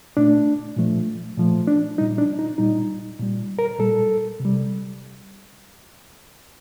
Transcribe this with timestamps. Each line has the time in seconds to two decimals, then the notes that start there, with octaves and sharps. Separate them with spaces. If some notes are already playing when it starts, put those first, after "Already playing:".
0.17 A#2 A3 D4
0.77 A#2 F3 A3
1.37 A#2 F3 A3
1.68 D4
1.98 G3 D#4
2.01 A#2
2.18 D4
2.39 D#4
2.58 A#2 G3 D#4
3.19 A#2 G3
3.59 A#4
3.79 A#2 G3 A4
4.40 C3 G3